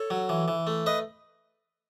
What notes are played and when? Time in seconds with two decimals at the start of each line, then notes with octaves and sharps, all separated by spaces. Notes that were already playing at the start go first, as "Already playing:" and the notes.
Already playing: A4 C#5
0.10 F#3
0.29 E3
0.48 E3
0.67 A3
0.86 B4 D#5